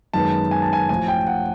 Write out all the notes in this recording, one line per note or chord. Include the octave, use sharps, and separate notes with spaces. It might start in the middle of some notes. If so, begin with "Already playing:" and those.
F#2 D#3 G#3 B3 A5
G#5
A5
G#5
A1 A2 F3 G#5
G5
F#5